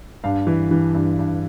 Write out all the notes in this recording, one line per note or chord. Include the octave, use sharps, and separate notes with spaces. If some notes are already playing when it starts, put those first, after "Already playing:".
G2 F5
E3
E3
G2
G2